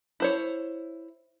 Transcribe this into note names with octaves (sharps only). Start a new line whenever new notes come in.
E4 C5 C#5